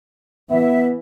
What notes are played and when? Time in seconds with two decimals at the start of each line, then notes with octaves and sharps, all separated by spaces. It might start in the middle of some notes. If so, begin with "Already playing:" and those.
0.50 E3 B3 E5